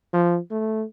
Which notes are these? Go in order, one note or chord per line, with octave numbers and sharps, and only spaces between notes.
F3
A3